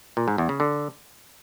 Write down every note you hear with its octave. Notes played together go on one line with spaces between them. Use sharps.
A#2
G#2
E2
C#3
D3